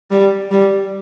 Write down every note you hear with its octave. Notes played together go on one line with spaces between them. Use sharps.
G3
G3